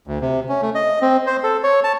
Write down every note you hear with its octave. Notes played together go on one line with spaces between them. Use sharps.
D2
C3
C#4
A3
D#5
C4
C5
A4
C#5
A5